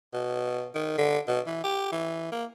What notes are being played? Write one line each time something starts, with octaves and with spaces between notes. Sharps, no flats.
B2
D#3
D3
B2
E3
G4
E3
A#3